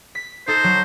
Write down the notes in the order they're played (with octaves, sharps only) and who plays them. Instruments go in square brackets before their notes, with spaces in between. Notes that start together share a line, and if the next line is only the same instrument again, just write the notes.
[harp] B6
[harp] D#4 A4 A#6 [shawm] C5
[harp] F#3